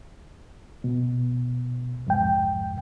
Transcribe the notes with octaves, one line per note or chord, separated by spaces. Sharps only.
B2
C2 F2 G#2 G5